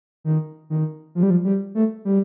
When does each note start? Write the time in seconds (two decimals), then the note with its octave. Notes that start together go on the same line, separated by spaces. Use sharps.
0.24 D#3
0.70 D#3
1.15 F3
1.23 G3
1.30 F3
1.45 G3
1.75 A3
2.05 G3